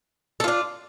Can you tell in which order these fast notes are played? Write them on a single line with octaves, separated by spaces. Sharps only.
A4 F4 D4